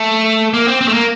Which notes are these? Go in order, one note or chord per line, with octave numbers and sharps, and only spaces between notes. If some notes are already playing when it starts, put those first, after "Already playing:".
Already playing: A3
A#3
C4
C4
A3
A#3